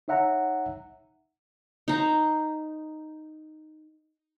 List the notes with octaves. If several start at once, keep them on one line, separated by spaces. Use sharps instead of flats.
D#4 C#5 E5 F#5 A#5
D#4 C5 A#5